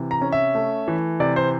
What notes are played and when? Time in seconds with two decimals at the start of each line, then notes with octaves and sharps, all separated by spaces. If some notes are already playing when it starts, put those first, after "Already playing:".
Already playing: C3 E3
0.11 A#5
0.22 C#4
0.32 E5
0.55 A3
0.88 E3
1.20 C3 D5
1.36 C5